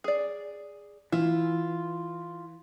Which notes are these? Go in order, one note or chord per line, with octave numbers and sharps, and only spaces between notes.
G#4 D5
E3 E4 F4